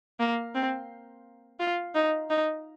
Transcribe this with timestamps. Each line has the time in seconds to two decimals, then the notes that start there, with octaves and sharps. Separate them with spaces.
0.20 A#3
0.55 C4
1.60 F4
1.95 D#4
2.30 D#4